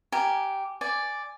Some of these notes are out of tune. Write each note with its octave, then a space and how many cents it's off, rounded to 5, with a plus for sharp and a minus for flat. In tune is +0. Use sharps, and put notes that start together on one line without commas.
G4 -10 A#4 +0 G#5 +0
D5 +0 G#5 +0